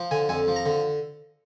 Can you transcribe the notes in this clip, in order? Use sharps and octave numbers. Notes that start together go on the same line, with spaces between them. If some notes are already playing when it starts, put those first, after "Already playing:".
Already playing: F3
D3 G#5
F2 G#5
F3
A#5
D3